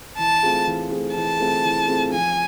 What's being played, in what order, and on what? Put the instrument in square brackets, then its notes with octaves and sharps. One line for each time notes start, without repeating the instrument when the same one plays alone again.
[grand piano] E3 [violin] A5
[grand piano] A3 C4 F4 G#4
E3
A3 C4 F4 G#4
[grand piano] E3 [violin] A5
[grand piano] A3 C4 F4 G#4
E3
A3 C4 F4 G#4
[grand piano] F3 [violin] G#5